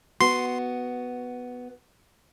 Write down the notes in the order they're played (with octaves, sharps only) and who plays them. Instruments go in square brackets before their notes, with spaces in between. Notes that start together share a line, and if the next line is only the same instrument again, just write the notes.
[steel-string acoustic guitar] B3 F#4 [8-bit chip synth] C6